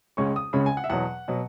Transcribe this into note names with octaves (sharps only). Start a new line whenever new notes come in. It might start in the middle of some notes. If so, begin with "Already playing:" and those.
C#2 C#3 G#3 C#4 C#6
D#6
C#2 C#3 G#3 C#4 B5
G#5
F#5
E5
E2 B2 F#3 F#5
B2 F#3